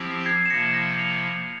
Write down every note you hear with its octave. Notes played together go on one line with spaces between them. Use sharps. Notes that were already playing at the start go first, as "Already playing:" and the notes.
Already playing: F3 C4 E4 G4
G#6 C7
E7
C3 F3 A#3 E4 A#6 C#7
A#6 C#7
C#7 F7